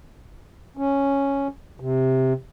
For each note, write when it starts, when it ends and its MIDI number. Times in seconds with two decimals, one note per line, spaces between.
0.77 1.48 61
1.80 2.33 48